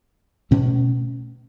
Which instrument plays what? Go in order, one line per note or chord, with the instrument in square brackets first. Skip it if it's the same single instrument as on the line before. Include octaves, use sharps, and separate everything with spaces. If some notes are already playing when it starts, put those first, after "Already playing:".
[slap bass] B2 A3 C#4